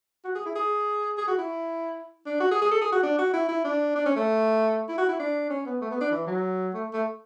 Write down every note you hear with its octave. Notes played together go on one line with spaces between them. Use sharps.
F#4
G#4
E4
G#4
G#4
F#4
E4
D4
F#4
G#4
G#4
A4
G#4
F#4
D4
F#4
E4
E4
D4
D4
C#4
A3
E4
F#4
E4
D4
C#4
B3
A3
B3
D4
E3
F#3
A3
A3